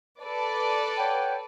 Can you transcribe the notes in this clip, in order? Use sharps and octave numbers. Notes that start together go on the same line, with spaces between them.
A4 B4 D5
C#5 F#5 G5